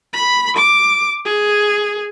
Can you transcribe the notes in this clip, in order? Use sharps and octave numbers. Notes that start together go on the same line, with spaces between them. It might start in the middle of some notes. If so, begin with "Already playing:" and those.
B5
D6
G#4